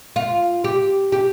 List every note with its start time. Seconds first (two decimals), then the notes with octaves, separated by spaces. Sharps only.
0.16 F4
0.64 G4
1.12 G4